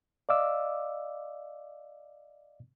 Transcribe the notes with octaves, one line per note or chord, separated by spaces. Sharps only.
D5 D#5 F5 D6 E6